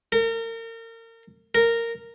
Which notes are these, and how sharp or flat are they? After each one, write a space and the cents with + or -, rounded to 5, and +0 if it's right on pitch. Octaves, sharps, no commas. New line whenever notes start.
A#4 -35
A#4 -10